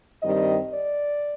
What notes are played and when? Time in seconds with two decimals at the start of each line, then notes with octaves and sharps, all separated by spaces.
0.23 G2 D#3 G3 C4 D#5
0.74 D5